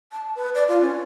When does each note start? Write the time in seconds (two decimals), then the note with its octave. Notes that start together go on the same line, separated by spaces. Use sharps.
0.12 A5
0.35 B4
0.55 D5
0.68 F4
0.81 C#4